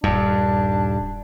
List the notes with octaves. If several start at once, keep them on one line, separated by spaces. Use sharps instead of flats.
D#1 G2 D4